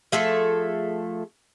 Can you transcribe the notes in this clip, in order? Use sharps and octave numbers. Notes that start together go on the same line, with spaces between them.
F3 A3 G#4 A4